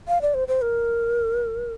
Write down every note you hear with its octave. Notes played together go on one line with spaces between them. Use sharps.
F5
D5
C5
C5
A#4